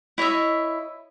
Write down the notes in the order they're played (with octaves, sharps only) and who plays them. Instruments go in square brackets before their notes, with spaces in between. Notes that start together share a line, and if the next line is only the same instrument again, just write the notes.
[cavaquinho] E4 C#5 D#5 E5